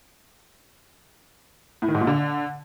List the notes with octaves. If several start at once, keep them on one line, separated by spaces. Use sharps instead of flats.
A2
D#3
G#2
A#2
D3